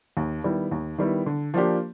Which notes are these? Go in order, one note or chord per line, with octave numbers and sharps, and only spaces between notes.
D#2
D#3 G3 B3 E4
D#2
D#3 G3 B3 E4
D3
F3 A#3 D4 G4